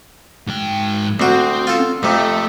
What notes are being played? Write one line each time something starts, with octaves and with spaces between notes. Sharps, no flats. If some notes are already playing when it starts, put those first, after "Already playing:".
G#2 G5
D2 C4 F#4
F4 A4
F2 C3 A3